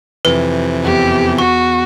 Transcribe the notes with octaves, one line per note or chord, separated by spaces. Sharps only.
F2 C3 E3 B4
E2 B3 G4
F#4 C#6